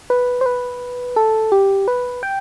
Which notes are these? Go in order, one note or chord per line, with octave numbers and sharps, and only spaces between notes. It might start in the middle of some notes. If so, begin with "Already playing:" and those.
B4
C5
B4
A4
G4
B4
G5